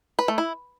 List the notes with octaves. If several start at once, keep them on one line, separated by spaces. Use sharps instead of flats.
B4
A3
E4